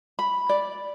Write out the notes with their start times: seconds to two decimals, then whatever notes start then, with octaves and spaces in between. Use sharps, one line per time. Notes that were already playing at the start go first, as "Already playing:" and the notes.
0.19 B5
0.49 D5